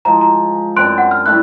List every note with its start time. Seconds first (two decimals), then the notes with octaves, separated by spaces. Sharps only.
0.05 F3 G#3 A#5
0.21 A#5
0.76 F#2 C4 D4 C6 F#6 D7
0.98 F#5
1.11 F6
1.26 G3 A3 E4 F#6